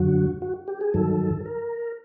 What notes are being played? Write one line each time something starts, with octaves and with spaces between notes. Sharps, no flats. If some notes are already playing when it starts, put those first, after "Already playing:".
Already playing: F#2 D3 F#3 F#4
F#4
G4
G#4
G2 D#3 F#3 A4
A#4